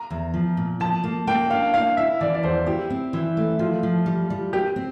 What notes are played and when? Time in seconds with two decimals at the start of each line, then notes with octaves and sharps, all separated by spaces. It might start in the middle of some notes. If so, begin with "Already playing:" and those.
Already playing: A#5
0.10 E2
0.34 F3
0.57 A#2
0.80 F3 A5
1.04 A#3
1.27 A#3 G5
1.50 D4 F5
1.74 E4 F5
1.97 E4 E5
2.21 E3 D5
2.34 D5
2.43 E2 C5
2.66 E4 G4
2.90 C4
3.13 E3 E4
3.37 A3
3.59 F3 F4
3.83 F3
4.06 G3
4.30 G3
4.53 C4 G4
4.76 C4